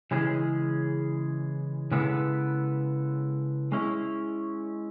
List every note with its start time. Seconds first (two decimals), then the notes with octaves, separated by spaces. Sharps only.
0.11 C#3 E3 G#3 C#4 G#4
1.91 C#3 G#3 B3 E4 A4
3.72 G#3 C#4 E4